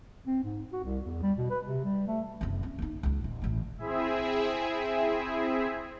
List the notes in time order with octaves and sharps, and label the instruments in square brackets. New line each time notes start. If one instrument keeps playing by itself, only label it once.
[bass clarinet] C4
G#2
F#4
C2
E2
G3
B2
B4
C3
G3
A3
[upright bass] F#1 C3
C4 C#4
A#3 D#4
C#2 F4
D#1
A1 A3
[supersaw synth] C4 E4 G#4 E5